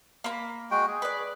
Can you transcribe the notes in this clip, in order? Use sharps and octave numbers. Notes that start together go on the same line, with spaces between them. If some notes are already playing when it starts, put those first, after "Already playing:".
A#3 B5
G#3 F#4 G5
G#4
B4 D5